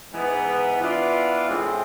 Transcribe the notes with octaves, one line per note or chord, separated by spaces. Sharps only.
G#2 E3 B3
E3 B3 D4 F4
A2 G#3 C4